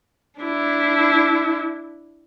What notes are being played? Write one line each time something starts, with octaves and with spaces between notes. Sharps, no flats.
D4 E4